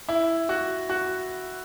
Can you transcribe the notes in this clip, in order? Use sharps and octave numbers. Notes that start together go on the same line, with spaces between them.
E4
F#4
F#4